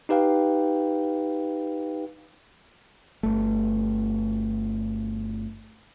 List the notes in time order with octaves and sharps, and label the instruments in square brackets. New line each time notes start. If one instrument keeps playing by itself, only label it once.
[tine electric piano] D#4 G4 B4 F5 G5
[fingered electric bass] G1 A3